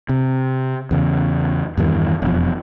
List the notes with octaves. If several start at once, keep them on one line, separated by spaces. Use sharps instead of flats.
C3
E2 C#3
E2 G2 D#3 E3
E1 F2